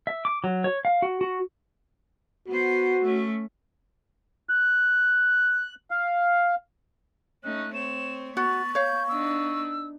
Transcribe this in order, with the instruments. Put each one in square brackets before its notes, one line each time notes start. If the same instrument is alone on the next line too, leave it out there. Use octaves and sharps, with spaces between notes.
[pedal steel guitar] E5
D6
F#3
C#5
F5
F#4
F#4
[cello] B3 C5 [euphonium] F#4
[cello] A3 C#4
[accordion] F#6
F5
[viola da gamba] A3 C#4 D#4 [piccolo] F#6
[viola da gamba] C4 C#5 [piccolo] E7
[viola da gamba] B3 [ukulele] F#4 [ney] C#6 [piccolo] A6
[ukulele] C#5 F5 [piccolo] G6
[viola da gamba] B3 D4 D#4 [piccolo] E6